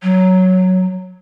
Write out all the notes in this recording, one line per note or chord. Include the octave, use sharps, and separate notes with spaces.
F#3